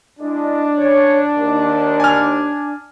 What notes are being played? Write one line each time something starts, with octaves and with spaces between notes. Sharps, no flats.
G#3 D4 E4 D#5
C#3 C#5
D#2
G#5 F6